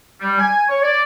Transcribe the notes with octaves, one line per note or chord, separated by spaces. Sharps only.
G3
G#5
C#5
D5